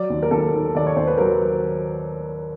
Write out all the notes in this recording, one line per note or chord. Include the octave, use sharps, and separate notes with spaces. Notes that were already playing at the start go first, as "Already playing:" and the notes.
Already playing: F#3 D5
D#2
A#4
D#2 A4
D#3
D#2 D5
C#5
D#2 C5
B4
F#3 A#4